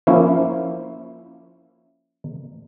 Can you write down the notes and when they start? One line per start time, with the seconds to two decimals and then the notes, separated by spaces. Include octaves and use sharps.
0.07 F3 A#3 C#4 E4